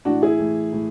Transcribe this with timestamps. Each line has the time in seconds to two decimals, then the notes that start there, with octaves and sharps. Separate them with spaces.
0.05 A2 E3 D4 F#4
0.22 E4 G#4
0.39 A2 E3
0.72 A2 E3